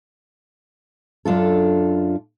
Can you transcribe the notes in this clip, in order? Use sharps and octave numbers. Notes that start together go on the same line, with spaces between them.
F#2 D4 F4 A4